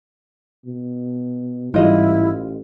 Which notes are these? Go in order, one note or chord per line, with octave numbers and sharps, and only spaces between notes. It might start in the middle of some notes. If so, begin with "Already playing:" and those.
B2
A1 G#2 E3 G3 E4 F4 D#5